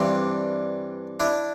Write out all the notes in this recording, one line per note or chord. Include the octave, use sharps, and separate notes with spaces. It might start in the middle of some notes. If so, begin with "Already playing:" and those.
Already playing: G2 E3 G3 C4 D4
D4 E4